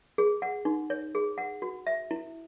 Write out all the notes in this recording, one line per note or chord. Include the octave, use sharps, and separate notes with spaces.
G#4
F#5
D#4
C#5
G#4
F#5
F#4
E5
E4